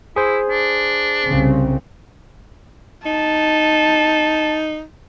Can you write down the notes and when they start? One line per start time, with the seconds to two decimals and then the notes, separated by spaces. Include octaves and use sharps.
0.16 E4 G#4 C5
0.50 D4
1.24 C2 C#3 C4
3.06 D#4 A5